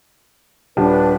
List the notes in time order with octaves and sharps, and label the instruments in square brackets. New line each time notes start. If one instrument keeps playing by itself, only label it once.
[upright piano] D#1 G4 A5 [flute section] D4 B4